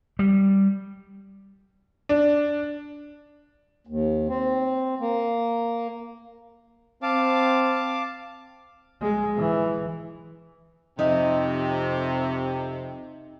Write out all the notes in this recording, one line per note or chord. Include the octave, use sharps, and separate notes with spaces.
G3
D4
D#2
C4
A#3
C4 F5 A5 D6
G#3
E3
F2 C3 D#4 D#5